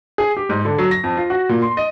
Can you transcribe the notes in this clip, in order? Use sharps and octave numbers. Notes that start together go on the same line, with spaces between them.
G#4
G4
G#2
D3
F#3
A#6
F2
F4
F#4
A#2
C6
D#5